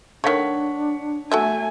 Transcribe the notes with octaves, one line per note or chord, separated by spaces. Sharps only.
D#3 A3 D4 C#5 F#5 B6
A3 F#4 A4 E5 G#5